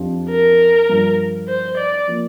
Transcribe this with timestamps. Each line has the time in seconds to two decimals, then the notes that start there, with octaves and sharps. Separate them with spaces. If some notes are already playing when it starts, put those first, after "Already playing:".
Already playing: F2 F3 D4 G4
0.30 A#4
0.89 G2 F3 D4
1.48 C5
1.77 D5
2.07 F3 A#3